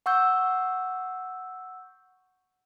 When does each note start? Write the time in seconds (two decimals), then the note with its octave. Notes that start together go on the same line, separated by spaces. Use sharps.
0.06 F#5 C#6 E6 G6